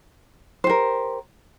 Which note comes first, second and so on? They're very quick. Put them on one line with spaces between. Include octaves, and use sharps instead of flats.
C5 G4 A#4